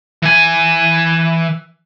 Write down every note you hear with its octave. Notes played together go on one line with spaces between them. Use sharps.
E3 G#5